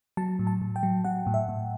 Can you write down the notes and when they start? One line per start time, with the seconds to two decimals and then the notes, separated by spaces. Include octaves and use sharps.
0.17 F#3 A5
0.39 A2
0.47 A5
0.62 A2
0.76 G5
0.83 F#3
1.04 F#3 F#5
1.26 A2
1.34 E5
1.49 A2